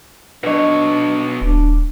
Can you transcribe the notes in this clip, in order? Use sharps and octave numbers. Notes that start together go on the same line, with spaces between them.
B2 D4 B4 C#5 D#5
D#1 D4